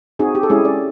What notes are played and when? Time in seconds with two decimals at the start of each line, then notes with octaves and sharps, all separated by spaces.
0.19 C4 D#4 F#4 G#4
0.35 G4
0.43 A4
0.50 G#3 C#4 E4 G4 G#4
0.65 D5